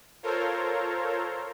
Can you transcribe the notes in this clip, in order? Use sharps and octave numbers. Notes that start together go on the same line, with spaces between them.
F4 A4 A#4 C5 C#5